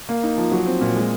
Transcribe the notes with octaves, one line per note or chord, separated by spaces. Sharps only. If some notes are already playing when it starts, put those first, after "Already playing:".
A#3
D#4
F3
F#3
C4
A#2
G#3